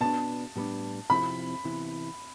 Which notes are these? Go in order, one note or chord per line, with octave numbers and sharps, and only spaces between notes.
B2 B3 D4 A5
A2 G3 B3 D4
C3 F3 C4 E4 B5
C3 E3 B3 E4